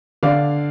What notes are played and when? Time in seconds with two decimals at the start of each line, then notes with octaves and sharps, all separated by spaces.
0.23 D3 D5 F5